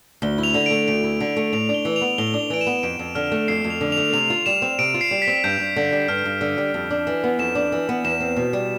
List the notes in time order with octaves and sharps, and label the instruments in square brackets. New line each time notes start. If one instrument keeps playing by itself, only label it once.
[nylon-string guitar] D2 [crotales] G7
[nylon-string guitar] E4
[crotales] F7
[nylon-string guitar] D3
[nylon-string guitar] A3 [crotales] D7
[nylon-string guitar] D2 [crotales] D7
[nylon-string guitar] E4
D3
A3
[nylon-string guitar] A2 [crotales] F7
[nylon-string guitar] D4
[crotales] G7
[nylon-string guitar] E3
[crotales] F7
[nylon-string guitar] B3
[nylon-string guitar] A2 [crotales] G7
[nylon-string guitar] D4
[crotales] F7
[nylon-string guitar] E3 [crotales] D7
[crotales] E7
[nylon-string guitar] B3
[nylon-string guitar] F2 [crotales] D7
[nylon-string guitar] F2
[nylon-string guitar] D3 [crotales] F6
[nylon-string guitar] A3
[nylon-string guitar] F2 [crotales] C7
[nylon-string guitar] F2
[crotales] F7
[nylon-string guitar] D3
[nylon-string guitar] A3 [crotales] F7
[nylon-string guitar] C3 [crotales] F7
[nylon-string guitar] F4
[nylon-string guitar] G3 [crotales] E7
[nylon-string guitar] C4
[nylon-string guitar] C3 [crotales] D7
[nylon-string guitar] F4
[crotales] C7
[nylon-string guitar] G3
[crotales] B6
[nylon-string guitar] C4
[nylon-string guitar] G2 [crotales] G6
[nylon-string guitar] G2
D3
G3
[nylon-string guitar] G2 [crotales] F6
[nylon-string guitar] G2
D3
G3
F2
D4
E3
B3
[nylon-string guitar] F2 [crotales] E7
[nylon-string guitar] D4
E3
B3
[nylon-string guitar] E2 [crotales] E7
[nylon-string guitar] C4
B2
G3